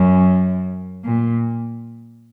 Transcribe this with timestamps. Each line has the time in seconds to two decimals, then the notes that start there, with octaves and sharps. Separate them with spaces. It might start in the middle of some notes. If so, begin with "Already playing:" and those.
Already playing: F#2
1.04 A#2